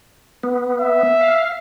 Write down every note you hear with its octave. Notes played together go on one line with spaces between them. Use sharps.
B3
E5
F5